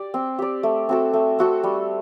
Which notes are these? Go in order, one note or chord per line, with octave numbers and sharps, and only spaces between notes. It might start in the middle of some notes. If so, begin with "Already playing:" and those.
Already playing: G4 D5
C4
G4 D5
A3
C4 F#4 A4
A3
C4 F#4 A4
G3